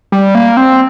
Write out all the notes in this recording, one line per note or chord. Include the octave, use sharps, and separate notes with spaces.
G3
A#3
C4